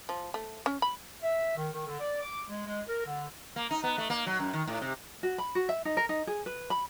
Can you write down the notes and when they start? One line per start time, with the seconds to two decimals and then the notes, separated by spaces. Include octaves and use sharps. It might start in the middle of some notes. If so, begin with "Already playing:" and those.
0.09 F3
0.34 A3
0.66 C#4
0.82 B5
1.22 E5
1.56 D#3
1.73 D#3
1.87 D3
2.00 D5
2.21 D6
2.47 G#3
2.66 G#3
2.87 A#4
3.04 D3
3.56 A#3
3.71 D#4
3.84 B3
3.98 A3
4.10 A#3
4.26 F#3
4.40 F#2
4.53 D#3
4.67 A2
4.81 C3
5.23 F#4
5.38 B5
5.55 F#4
5.69 E5
5.85 D#4
5.97 A#4
6.09 D#4
6.27 G#4
6.46 B4
6.70 B5